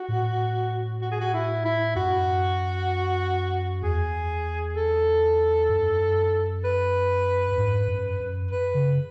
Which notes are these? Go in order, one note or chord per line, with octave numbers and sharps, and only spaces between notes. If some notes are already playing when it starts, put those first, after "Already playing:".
Already playing: F#4
A2
F#4
G#4
F#4
E4
E4
F#2 F#4
E2 G#4
A4
F#2
B4
F#2
G#2
F#2
F#2
B4
C#3